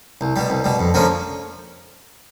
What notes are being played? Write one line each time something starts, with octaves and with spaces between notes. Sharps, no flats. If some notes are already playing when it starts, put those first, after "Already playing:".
C2
B2 G3
C2
B2 G3
F2
D3 F3 A#3 C#4